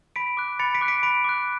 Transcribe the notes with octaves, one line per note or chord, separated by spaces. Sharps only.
B5 B6 D7
D6 F#6
B5 A6 C#7
B6 D7
D6 F#6
B6 D7
B5 B6 D7
D6 F#6